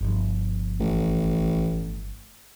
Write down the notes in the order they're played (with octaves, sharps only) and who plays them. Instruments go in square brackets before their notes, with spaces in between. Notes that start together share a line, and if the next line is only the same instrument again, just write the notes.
[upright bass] G1 F3
[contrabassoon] A1